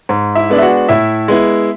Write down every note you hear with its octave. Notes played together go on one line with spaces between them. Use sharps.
G#2
E4 E5
G#3 B3 D4
E5
F#4 F#5
A2 E4 E5
G#3 B3 E4